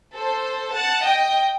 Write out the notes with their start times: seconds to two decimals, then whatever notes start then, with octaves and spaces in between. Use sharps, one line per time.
0.14 A4 C5
0.75 F#5 A5
1.04 D#5 G5